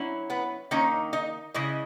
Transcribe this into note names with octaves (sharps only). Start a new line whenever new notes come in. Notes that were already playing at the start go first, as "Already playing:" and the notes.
Already playing: F#3 C#4 E4
B3 B4
D#3 A#3 C#4 D#4 C#5
D#4 D#5
C#3 G#3 C#4 E4 D#5